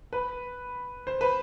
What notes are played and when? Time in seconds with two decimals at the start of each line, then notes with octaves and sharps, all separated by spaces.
0.13 B4
1.07 C5
1.21 B4